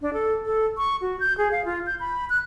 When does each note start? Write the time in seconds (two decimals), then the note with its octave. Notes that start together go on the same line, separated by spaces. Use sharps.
0.01 D4
0.13 A4
0.46 A4
0.77 C#6
1.01 F#4
1.20 G6
1.38 G#4
1.52 F5
1.65 F4
1.86 G6
2.00 B5
2.30 F#6